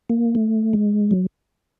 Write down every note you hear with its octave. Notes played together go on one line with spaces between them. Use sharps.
A#3
A3
G#3
F#3